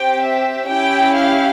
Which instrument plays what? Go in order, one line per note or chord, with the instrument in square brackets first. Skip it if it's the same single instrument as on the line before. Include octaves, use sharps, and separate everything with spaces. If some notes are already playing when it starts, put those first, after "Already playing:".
Already playing: [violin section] C4 G4 G5
E5
C#4 E4 G4 G5
F5